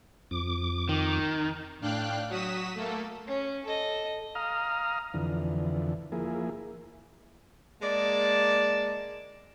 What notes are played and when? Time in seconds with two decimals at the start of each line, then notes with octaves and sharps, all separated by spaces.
0.31 F2 D6
0.89 D#3
1.81 A2 D4 F5 G5 F#6
2.29 F#3 F#4 D#6 B6 E7
2.75 A3 A#3 A4
3.27 C#4
3.65 A4 D#5
4.35 F5 A#5 D#6 F6
5.14 F2 D3 E3
6.12 F3 A#3 E4 G#4
7.82 G#3 A#3 D5 A5